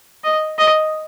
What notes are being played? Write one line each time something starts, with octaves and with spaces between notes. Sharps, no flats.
D#5
D#5